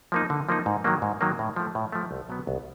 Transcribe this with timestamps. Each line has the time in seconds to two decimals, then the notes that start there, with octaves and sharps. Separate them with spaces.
0.12 F3 A#3 D#4
0.30 D3
0.49 F3 A#3 D#4
0.66 G#2
0.84 D#3 F#3 A#3
1.02 G#2
1.21 D#3 F#3 A#3
1.39 A2
1.56 F3 A3
1.75 A2
1.92 F3 A3
2.11 C2
2.29 B2 F#3 B3
2.47 C2